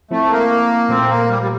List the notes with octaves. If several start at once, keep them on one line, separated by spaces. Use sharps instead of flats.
F3 A3 C4 E4
A#3
A#2 F3 A3 C4
A#3
G3
G3